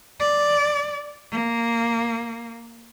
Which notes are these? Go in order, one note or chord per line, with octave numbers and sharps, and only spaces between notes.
D5
A#3